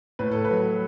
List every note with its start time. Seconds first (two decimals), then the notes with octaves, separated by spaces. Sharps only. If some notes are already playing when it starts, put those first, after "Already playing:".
0.19 A2 B4
0.32 A4
0.44 B4
0.51 F#3